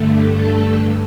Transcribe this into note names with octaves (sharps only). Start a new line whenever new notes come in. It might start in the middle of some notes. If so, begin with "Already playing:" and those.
Already playing: G2 D3 A3
A4
G2